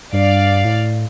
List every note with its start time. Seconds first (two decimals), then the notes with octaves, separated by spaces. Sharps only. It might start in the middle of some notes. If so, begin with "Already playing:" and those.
0.12 G2 D5 F5
0.65 A2